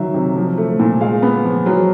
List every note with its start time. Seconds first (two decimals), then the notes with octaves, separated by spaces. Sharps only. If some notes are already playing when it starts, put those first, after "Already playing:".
Already playing: D#3 F#3 E5
0.14 C3
0.36 F3
0.57 A3
0.79 A#2
1.01 G#3 F5
1.22 B3
1.44 F3
1.66 F#3